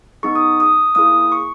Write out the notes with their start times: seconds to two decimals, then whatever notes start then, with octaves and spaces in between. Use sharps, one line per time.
0.23 B3 D#4 G#4 C#6
0.35 D#6
0.60 D#6
0.95 A#3 E4 G#4 D#6
1.32 C#6